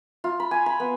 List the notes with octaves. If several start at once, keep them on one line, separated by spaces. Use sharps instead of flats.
F4
B5
G#5
B5
B3